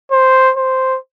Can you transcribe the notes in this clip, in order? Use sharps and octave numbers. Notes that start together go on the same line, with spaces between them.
C5
C5